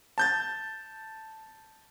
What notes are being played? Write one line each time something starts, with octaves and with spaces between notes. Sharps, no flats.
A5 G6 A6